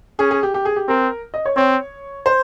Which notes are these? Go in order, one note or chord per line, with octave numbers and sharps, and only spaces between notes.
C#4 G#4
G#4
G4
G4
G#4
G4
C4 A#4
D#5
C#5
C4 C#5
C5